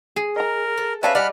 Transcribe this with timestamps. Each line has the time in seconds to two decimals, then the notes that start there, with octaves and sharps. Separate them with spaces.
0.16 G#4
0.36 A#4 D#5 A#5
0.78 A4
1.03 C#4 G4 B4 D5 E5 F5 A5 A#5
1.15 G3 D#4 D5 F#5 G#5 B5 F6